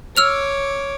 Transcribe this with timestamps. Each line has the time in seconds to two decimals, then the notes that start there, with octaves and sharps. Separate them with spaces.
0.17 C#5 D6 E6 F6 F7